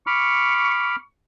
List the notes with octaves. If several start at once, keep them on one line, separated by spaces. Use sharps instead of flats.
B5 C#6 D6 F6